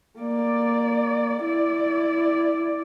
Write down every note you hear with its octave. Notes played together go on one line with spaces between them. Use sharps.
A#3 D5
E4 D5